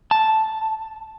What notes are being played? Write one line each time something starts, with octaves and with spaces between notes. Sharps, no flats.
A5